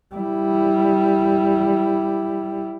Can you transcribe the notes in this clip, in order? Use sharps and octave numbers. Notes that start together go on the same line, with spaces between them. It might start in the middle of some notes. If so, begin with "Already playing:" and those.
G3 E4